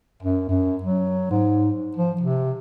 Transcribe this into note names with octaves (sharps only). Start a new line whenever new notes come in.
F#2
F#2
F#3
G#2
F3
C3